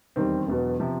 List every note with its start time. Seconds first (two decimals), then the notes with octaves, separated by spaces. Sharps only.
0.16 E1 D#2 D#3 G3 C4
0.47 E1 E2 B2 F#3
0.80 C3 F3